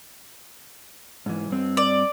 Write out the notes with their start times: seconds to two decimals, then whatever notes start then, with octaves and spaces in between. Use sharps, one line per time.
1.26 G#2 E3
1.50 G2 C4
1.77 D5